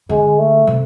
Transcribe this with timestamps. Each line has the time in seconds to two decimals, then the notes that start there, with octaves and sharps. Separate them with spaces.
0.09 D3 G#3
0.39 A3
0.67 C3